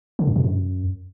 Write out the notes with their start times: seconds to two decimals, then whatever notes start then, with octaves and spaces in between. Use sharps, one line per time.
0.19 D3
0.27 F#2
0.36 B2
0.44 F#2